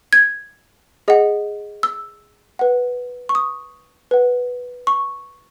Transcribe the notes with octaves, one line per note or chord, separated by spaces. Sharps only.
G#6
G#4 D#5 F#5
E6
B4 F#5
C#6
D#6
B4 F#5
C#6